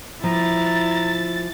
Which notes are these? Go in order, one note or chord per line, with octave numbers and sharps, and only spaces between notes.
F3 E4 A#5 A6